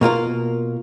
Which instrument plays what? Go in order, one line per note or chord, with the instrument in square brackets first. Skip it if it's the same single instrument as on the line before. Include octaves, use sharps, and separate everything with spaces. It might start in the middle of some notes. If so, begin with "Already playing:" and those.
[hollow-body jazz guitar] B2 A#3 F4 A#4